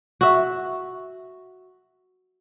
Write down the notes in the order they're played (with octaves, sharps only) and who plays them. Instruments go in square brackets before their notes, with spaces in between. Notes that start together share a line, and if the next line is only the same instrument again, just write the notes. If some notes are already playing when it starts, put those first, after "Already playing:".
[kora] F#4 E5